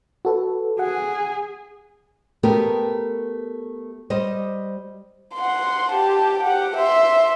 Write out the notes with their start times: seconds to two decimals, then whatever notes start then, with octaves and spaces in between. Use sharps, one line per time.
0.25 F#4 A4 B4
0.79 G#4 F#5
2.43 A3 B3 G4 A#4
4.10 G3 C5 D#5
5.35 F#5 C6
5.92 G4 A5
6.43 G4 F#5
6.76 E5 C6